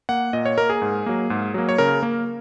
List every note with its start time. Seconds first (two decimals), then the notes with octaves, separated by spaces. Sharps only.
0.09 A#3 F#5
0.33 A#2 D#5
0.46 C#5
0.58 A#3 A#4
0.70 G#4
0.82 G#2
1.06 F#3 A#3
1.30 G#2
1.54 F#3 A#3
1.69 C#5
1.78 C#3 A#4
2.03 A#3